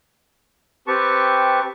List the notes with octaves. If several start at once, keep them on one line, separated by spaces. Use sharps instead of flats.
C4 G4 B4 A5 C#6